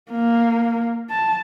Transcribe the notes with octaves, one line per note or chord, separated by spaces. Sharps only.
A#3
A5